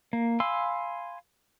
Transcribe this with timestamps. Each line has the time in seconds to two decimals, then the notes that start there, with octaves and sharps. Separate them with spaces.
0.13 A#3
0.40 F5 G#5 B5 C6 E6